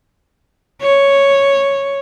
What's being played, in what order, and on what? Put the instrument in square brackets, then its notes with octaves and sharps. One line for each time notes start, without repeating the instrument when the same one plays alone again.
[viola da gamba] C#5